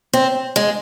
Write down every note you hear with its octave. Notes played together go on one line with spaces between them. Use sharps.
C4
G#3